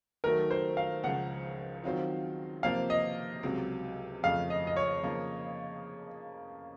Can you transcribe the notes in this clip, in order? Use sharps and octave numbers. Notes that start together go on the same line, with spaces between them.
D#3 F#3 A3 A#4
C5
F5
C#2 C#3 F3 F#5
D#3 F#3 C4 F4 C5
C3 F3 A#3 F4 C5 F5
D#5
C#2 C3 F#3
F2 C#3 F3 A3 F5
D#5
D#5
C#5
C#3 F3 A#3